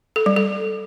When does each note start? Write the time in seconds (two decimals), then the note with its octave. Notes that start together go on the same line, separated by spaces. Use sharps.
0.16 A4
0.26 G3
0.36 A4